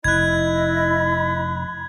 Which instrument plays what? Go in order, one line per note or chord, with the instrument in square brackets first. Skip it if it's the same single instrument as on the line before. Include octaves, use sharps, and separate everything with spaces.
[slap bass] F1 [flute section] E4 D#5 [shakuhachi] B5 [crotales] F#6 G#6